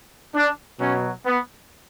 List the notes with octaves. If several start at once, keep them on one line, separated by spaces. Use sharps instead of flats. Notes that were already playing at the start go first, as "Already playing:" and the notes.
D4
B2 F#3 C#4
B3